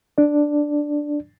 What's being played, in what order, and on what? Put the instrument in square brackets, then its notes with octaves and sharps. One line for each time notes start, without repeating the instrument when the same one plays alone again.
[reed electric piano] D4 D5